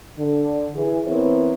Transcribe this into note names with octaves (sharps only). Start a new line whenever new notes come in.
D3
E3 G#4
E3 B3 C4 A#4 C#5